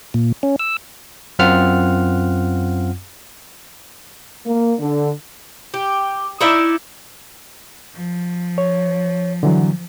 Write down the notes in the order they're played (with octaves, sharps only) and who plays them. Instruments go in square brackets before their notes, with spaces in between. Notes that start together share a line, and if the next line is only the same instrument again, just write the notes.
[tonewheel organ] A#2
C#4
E6
[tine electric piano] F#2 C4 F4 F#5 F6
[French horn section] A#3
D3
[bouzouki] G4
D#4 E4 D5 E5
[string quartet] F3
[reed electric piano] C#5
D3 E3 F#3